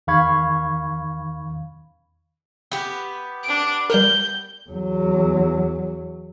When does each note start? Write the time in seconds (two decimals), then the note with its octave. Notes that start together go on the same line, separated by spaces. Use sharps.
0.07 E2 D#3 F5 B5 C#6 G#6
2.72 B3 G4
3.43 D4 D7
3.90 G3 A#4 G6
4.70 E2 F#3